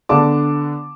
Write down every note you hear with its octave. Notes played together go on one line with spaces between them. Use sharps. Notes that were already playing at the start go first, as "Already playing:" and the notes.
D3 B3 D4 A5 D6